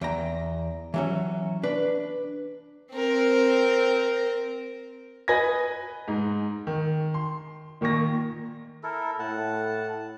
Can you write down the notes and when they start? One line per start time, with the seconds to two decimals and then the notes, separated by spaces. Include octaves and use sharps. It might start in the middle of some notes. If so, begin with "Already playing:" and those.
0.01 E2 G5 A#5
0.94 E3 F#3 C#4
1.63 D4 B4
2.92 C4 A#4
5.28 B4 D#5 G#5 B5 G#6 A#6
6.08 G#2 D#4
6.67 D#3
7.14 C6
7.81 A#2 D#3 A#3 C#6 A#6
8.83 E4 A4 A#4
9.19 A2 F#5 A5